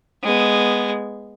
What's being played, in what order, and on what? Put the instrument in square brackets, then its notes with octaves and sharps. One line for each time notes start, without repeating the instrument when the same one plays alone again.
[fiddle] G#3 B3